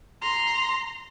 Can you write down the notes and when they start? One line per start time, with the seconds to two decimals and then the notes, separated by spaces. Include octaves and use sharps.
0.22 A#5 C6